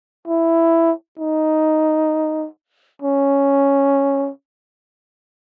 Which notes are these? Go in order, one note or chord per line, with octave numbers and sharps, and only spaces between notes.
E4
D#4
C#4